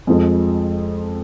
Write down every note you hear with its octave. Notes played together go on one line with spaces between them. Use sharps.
F2 F3 G#3